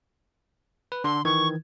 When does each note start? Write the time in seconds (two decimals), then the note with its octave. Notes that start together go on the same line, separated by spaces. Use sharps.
0.92 B4
1.04 D3 A4 C6
1.25 D#3 E3 C#6 G#6